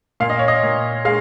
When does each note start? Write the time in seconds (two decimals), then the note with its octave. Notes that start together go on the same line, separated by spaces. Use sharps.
0.20 A#2 F5
0.30 D#5
0.39 C#5
0.48 D#5
0.63 A#2
1.05 G#3 F5